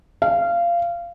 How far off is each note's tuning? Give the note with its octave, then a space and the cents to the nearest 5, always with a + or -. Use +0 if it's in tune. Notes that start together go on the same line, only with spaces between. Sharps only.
F5 -20